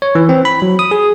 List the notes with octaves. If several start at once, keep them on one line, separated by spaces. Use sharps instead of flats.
C#5
E3
C4
B5
F#3
D#6
G#4